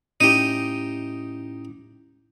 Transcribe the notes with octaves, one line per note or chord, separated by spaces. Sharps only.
A2 C#4 D#4 E4 G4 D#7